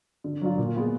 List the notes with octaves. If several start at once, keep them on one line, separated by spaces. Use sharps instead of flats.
D3
F#3 D4 F4
A#2
G#3 B3 F4